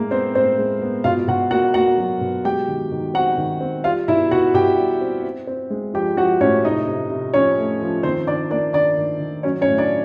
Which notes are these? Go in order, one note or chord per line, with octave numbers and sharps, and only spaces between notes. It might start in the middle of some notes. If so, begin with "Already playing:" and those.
Already playing: A2 G#3 A#3 A#4
B3 C4 C5
A2 C4 C5
G#3
B3
B2 F4 F5
B2 F#4 F#5
A#3 F#4 F#5
A#3 F#4 F#5
F#3
B2
G#3 G4 G5
D#3
D#3
C4 F#4 F#5
D#3
C4
G3 F4 F5
B2 E4 E5
B2 F#4 F#5
B2 G4 G5
G3
C4
C4
C4
G#3
F3 G4 G5
F3 F#4 F#5
A2 C#4 C#5
C3 D#4 D#5
C3
C3
F3 C#4 C#5
A3
F3
D#3 C4 C5
D#3 D4 D5
A#3 D4 D5
D#3 D4 D5
D#3
D#3
F#3 C#4 C#5
C#4 C#5
A2
D4 D5